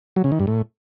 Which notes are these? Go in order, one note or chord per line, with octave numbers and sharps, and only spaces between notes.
F#3
C#3
D#3
G2
A2